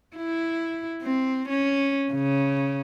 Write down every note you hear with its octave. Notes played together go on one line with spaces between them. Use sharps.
E4
C4
C#4
C#3